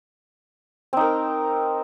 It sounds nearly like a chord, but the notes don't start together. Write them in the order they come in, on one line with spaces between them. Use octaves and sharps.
C4 D#4 A#4